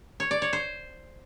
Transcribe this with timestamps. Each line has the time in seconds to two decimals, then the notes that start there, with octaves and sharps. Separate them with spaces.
0.20 C#5
0.31 D5
0.42 C#5
0.53 C5